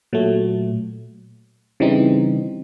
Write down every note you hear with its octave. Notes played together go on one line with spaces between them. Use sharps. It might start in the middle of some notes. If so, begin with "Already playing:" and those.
A#2 F#3 A3
C#3 E3 G3 C4 D#4